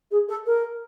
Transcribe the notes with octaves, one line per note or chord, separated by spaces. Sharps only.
G#4
A4
A#4